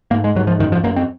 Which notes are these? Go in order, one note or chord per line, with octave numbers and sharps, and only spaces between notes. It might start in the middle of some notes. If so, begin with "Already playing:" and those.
G#2 A#3
G#3
G#2 F#3
F3
F#2 D#3
F3
F#2 A#3
C4